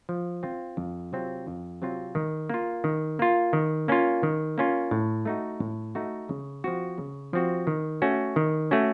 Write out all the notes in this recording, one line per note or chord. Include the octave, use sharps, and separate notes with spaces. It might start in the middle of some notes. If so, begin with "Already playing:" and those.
F3
C4 F4
F2
C3 F#3 C4 F4
F2
C3 F#3 C4 F4
D#3
A#3 F4
D#3
A#3 F4
D#3
A#3 C#4 F4
D#3
A#3 C#4 F4
A2
A3 D#4 F#4
A2
A3 D#4 F#4
C#3
F3 C4 F#4
C#3
F3 C4 F#4
D#3
A3 C#4 F#4
D#3
A3 C#4 F#4